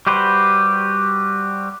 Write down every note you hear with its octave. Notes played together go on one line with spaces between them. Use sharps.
G3 F#4 G4 B4 C5